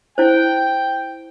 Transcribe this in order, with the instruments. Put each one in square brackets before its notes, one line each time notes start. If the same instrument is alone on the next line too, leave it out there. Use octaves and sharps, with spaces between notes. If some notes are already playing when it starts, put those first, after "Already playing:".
[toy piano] E4 C5 [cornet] G5